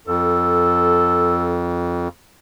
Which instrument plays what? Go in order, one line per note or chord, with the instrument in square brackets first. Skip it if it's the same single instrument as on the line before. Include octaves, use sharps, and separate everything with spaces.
[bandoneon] F2 [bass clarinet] A4